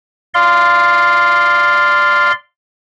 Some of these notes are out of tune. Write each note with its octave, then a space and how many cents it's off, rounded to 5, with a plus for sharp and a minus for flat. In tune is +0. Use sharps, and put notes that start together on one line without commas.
D5 +0 F5 +0 C6 -15